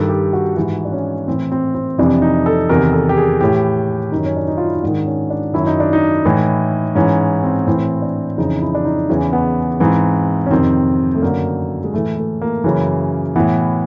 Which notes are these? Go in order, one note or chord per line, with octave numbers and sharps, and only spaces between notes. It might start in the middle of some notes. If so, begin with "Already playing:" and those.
Already playing: G2 D#3 A4
G4
F#4
G#2 E3 F#4
D4
C#4
A2 E3 C4
C4
C4
F2 C3 E3 D4
D#4
A4
E2 C3 D#3 A#4
A4
G4
G#4
A2 E3 G4
F#2 D#3 D#4
C#4
D4
D#4
F4
E4
D#4
G#2 D#3 D4
C#4
D4
F#2 D#3 E4
D#4
D4
D#4
A2 E3
G#2 E3 C#4
C4
A2 E3 C4
D4
F2 C#3 E3 D#4
E4
D4
D#4
E2 C#3 E3 C#4
B3
G#2 E3 C4
C#4
F2 C3 D#3 C4
A3
F#2 D3 A#3
G#3
A2 E3 A3
A3
A#3
F#2 C#3 E3
A2 E3 B3